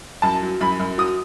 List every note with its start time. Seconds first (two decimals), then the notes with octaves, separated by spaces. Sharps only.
0.22 F#2 A5
0.42 F#3
0.61 F#2 B5
0.80 F#2
0.98 F#3 D#6